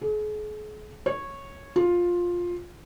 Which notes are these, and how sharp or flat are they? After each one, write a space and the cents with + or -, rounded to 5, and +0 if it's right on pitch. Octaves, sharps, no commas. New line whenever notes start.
G#4 +40
C#5 -10
F4 +10